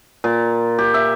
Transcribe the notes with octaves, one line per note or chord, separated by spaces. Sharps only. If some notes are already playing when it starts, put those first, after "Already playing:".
A#2
G4
E5